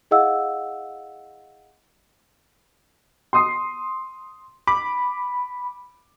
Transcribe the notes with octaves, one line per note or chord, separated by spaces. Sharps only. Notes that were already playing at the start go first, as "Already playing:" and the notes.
E4 G#4 D#5 F5 F#5 E6
C6 D#6 C7
B5 D6